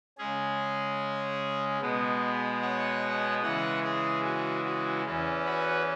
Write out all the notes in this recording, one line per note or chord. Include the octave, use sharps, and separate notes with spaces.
C#3 G#3 C#4 G#4
B2 G#3 B3
C#5 F#5
C#3 E3 G#3 C#5 F#5
G#4
F#4
F#4
E2 E3 C#4
F#4 B4